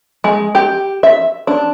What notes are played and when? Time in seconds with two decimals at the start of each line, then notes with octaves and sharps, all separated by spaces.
0.24 G#3
0.55 G4
1.03 E5
1.47 D4